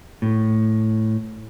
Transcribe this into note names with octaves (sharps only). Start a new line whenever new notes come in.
A2